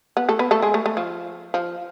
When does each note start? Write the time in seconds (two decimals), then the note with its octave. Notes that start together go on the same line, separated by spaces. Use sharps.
0.17 B3
0.29 A3 A4
0.39 B3 B4
0.51 A3 A4
0.62 G#3 G#4
0.74 A3
0.86 A3
0.97 F3
1.54 F3